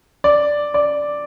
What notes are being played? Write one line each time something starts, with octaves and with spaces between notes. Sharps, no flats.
D5
D5